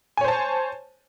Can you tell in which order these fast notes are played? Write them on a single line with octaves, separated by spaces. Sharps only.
G#5 C#5 C5 A5